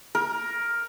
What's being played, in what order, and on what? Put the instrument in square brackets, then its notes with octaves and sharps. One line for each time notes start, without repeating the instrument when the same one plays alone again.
[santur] A#4